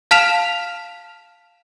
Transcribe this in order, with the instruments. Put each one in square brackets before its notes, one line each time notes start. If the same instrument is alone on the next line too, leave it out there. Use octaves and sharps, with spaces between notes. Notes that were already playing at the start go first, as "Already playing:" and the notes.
[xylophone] F5 A5 F6 B6 E7 F7